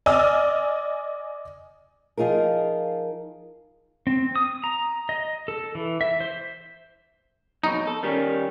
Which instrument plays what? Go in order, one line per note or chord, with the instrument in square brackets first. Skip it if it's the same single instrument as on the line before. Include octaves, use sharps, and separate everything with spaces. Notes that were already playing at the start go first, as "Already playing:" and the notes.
[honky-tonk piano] D5 D#5 G#5 E6 F6
[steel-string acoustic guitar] F3 D#4 F4 G#4 A#4
[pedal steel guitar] C4
D#6
A#5
D#5
A4
E3
E5
C5
[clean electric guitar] B1 F2 B2 [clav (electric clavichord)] D#4
[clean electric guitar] A4
D#3 G3 C#4